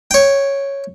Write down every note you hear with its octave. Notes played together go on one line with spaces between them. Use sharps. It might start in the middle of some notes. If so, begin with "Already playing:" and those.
C#5 G5